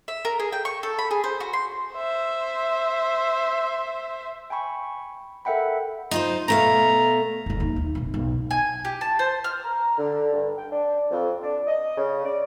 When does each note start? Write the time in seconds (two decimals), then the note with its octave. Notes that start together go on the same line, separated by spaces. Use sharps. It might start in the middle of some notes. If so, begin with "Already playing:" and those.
0.08 E5
0.25 A#4
0.40 G#4
0.52 G5
0.65 C#6
0.83 A4
0.99 B5
1.11 G#4
1.24 C5
1.40 F#4
1.53 C6
1.95 C5 E5
4.50 G5 G#5 B5 C#6
5.45 A4 A#4 E5 F#5 G5 B5
6.11 D#4 F4 C5
6.48 B2 A3 F5 A#5
7.46 F#1 F#2
7.60 D#2
7.76 D#3
7.95 F2 A#2
8.14 B1
8.51 G#5
8.85 G4
9.01 A5
9.19 C5
9.44 F6
9.64 A#5
9.98 D3
10.33 G2
10.57 G5
10.71 D4
11.11 F2
11.42 D4
11.67 D#5
11.98 C#3
12.25 D5